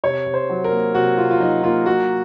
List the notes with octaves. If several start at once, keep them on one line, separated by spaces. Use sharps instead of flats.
C3 C#5
C3
C5
F#3
A#4
A#3
C3 F#4
C3 F4
F4
F#3 D#4
A#3 F4
A#3 F#4